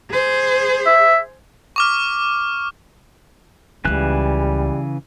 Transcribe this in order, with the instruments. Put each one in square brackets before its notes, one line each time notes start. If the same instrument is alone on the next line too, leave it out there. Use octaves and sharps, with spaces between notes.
[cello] G#4 C5
[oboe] E5
[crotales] C#6 D6 F6
[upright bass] C#2 F4 [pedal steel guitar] C#3 E3 F#6 [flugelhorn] G3